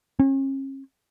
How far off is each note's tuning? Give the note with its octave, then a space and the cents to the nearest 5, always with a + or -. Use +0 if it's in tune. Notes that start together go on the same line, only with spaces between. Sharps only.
C#4 -40